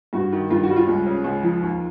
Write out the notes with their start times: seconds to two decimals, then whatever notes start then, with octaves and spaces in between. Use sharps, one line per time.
0.13 G2 F#4
0.32 D#3
0.50 G2 F4
0.63 F#4
0.69 G3
0.76 F4
0.88 C#2
1.06 C#3
1.24 C#2
1.43 F3
1.62 D#2